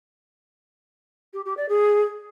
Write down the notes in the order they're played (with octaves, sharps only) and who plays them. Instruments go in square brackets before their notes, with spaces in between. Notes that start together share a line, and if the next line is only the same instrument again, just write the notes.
[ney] G4
G4
D5
G#4